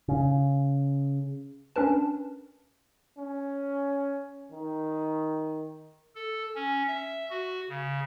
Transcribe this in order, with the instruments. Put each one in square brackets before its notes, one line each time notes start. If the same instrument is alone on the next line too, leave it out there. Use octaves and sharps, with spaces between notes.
[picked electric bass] C#3
[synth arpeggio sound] C#4 D4 A#4 B4 A5
[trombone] C#4
D#3
[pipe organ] A4
C#4
E5
F#4
C#3